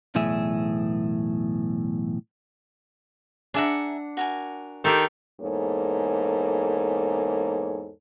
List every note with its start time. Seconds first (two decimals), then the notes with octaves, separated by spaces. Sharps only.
0.15 B1 E2 A2 G#4 E5
3.54 D4 G#4 E5 F#5 A#5
4.17 F#4 A#4 G#5
4.84 D#3 G4 A4
5.41 E2 G#2 A#3 A4 C#5